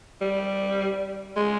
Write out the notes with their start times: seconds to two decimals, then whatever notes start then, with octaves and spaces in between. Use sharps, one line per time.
0.21 G3
1.36 G#3